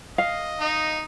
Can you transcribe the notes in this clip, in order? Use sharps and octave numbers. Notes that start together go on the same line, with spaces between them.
D#5 F5
D#4